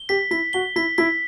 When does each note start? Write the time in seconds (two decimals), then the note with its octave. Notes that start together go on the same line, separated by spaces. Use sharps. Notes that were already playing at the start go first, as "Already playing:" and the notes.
Already playing: G7
0.09 G4 B6
0.31 E4 B6
0.53 F#4 G7
0.76 E4 B6
0.98 E4 B6